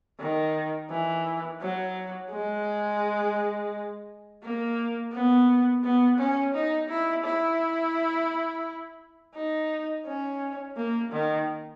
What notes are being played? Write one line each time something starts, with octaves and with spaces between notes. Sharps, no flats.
D#3
E3
F#3
G#3
A#3
B3
B3
C#4
D#4
E4
E4
D#4
C#4
A#3
D#3